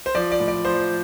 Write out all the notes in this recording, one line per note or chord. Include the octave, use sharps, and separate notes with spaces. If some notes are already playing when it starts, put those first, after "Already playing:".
C5
F3 D5
D5
A2
D5
F3 C5